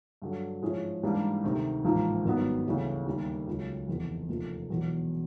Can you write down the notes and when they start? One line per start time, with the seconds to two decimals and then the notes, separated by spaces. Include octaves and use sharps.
0.22 G2 D3 F#3
0.62 G#2 F3 G#3 C#4 E4
1.03 G#2 E3 G3 A#3 D4
1.43 D2 C3 D#3
1.84 A1 G#2 F3 A#3 D#4
2.25 G#1 G2 D#3 F#3 B3
2.66 D2 C#3 E3 G3
3.06 D#2 D#3 G3
3.47 C#2 C#3 F#3
3.87 F1 E2 C3
4.29 F1 D#2 D3 F3 A3
4.70 E1 E2 B2 F#3